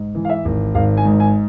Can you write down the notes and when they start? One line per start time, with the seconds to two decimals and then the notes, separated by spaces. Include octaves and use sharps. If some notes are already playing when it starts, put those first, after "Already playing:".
Already playing: G#2
0.15 E3
0.25 F5
0.30 E5
0.45 G#1
0.75 G#1 F5
0.97 G#5
1.05 G#2
1.20 G#5